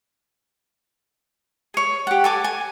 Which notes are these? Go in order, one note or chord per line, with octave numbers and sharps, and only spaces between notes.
G#4 C#5
G4 F#5
A4 G#5 D6
G#5